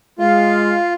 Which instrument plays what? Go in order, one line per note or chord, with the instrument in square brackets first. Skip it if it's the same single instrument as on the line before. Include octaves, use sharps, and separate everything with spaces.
[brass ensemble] G#3 [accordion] F4 [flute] F5